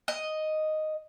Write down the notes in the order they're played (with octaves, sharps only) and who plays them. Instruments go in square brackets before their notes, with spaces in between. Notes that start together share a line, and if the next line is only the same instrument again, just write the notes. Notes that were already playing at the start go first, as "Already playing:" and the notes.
[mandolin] D#5